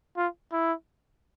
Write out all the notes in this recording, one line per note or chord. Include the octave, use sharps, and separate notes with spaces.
F4
E4